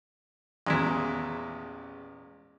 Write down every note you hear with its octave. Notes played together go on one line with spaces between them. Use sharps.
A1 E2 A#2 G#3 E4